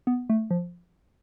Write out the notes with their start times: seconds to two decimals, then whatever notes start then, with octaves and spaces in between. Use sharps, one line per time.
0.07 B3
0.30 A3
0.51 F3